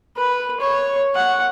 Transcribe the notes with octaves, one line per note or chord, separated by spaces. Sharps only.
B4
C#5
F#5